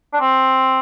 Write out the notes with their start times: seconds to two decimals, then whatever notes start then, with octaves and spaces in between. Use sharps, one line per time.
0.13 D4
0.20 C4